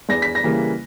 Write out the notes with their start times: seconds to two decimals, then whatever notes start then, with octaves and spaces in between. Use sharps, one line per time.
0.09 E2 A#6
0.22 B6
0.35 A#6
0.43 C#3 E3 G3 A#3